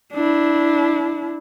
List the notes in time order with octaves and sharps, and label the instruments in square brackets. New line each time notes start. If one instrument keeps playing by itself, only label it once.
[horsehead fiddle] D4 E4